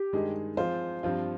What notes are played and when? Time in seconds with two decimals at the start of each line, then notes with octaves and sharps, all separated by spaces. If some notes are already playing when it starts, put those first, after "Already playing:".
Already playing: G4
0.13 G2 D#3 G#3 D#4 G#4
0.57 F3 C4 F4 G#4 C5
1.03 G2 F3 C4 F4